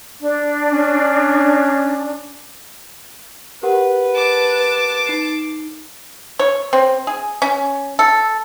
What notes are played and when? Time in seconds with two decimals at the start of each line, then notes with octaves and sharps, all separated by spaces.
0.21 D4
0.71 C#4
3.63 G4 A#4 B4 F#5
4.15 A5 D6
5.07 D#4 C7
6.39 C#5
6.73 C4
7.07 G#4
7.42 C#4
7.99 A4